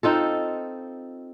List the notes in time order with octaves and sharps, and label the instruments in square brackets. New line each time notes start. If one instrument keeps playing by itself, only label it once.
[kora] C4 D#4 F4 A4